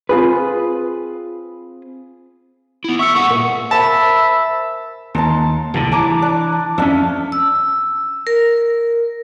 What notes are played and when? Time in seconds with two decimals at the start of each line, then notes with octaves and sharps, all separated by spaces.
0.09 C4 F4 G#4 B4
2.84 B3 E4
2.99 G4 E5 C#6 E6 C#7
3.15 A3 G#4 F#5 C#6
3.30 A#2 A#4
3.71 A#4 C5 E5 A5 B5
5.15 D#2 A5 A#5 C6
5.74 C2 A2 D3
5.92 E3 A5 A#5 D6
6.22 D4
6.78 F2 C#4 D4 E5 F5
7.32 E6
8.27 A#4